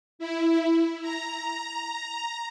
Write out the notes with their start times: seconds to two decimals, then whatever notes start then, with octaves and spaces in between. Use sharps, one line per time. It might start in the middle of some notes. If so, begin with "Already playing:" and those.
0.19 E4
1.02 A#5